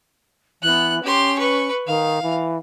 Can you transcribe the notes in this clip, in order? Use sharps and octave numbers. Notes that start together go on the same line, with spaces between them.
E3 B3 F#6
C#4 G4 C6
B4 C#6
D#3 F5
E3